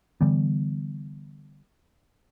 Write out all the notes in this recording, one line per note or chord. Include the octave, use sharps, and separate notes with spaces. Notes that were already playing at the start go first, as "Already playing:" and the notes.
D3 E3 G3 B3